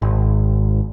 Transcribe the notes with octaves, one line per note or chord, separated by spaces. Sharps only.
G#1